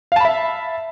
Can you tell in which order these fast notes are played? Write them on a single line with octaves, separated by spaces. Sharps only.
F5 A5 B5 E5